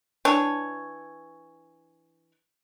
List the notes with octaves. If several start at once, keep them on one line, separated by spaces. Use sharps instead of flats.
E3 D4 C#5